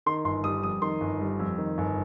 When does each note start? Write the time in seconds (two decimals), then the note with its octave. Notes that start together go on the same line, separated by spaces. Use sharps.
0.06 D#3 C6
0.25 G1 C6
0.44 G3 D#6
0.63 F2 D#6
0.82 D#3 C6
1.01 G1
1.21 G3
1.39 F2
1.58 D#3
1.78 G1